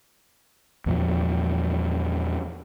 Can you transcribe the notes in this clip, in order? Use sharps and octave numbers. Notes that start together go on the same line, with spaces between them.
E2 A#2 F3